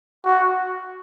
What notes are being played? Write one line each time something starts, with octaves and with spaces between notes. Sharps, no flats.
F#4